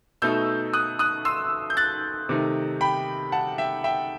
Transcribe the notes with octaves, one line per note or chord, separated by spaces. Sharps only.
B2 A3 D#4 E6 G6
D#6 F#6
D#6 F#6
C6 E6
G6
F#6 A6
C3 D#3 A3 D#4
G5 B5
F#5 A5
E5 G5
E5 G5